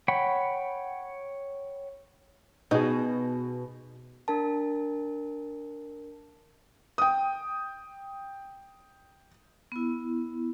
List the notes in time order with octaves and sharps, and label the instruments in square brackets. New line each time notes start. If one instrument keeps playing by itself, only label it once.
[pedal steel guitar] C#5 F#5 G5 B5
[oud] B2 [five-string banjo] D#4 G#4
[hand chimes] D4 A#4 A5
[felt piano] G5 D#6
[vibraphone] B3 E4